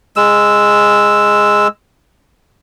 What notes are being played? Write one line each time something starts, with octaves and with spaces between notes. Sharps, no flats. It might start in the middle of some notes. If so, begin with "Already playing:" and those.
G#3 E6